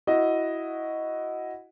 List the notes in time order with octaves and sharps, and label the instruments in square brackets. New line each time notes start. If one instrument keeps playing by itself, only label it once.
[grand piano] E4 F#4 D#5